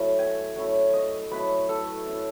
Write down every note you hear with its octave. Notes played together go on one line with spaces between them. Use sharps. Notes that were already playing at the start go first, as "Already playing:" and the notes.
Already playing: F#3 A3 E4
G#5
F#3 A3 C#4 E4
D#5
F#3 A3 C#4 E4 B4
A4
A3 C#4 E4